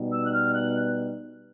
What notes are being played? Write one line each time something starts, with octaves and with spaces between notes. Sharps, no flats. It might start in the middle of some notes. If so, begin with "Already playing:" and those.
Already playing: B2 G3 B3 D#4
E6
F#6
F6
F#6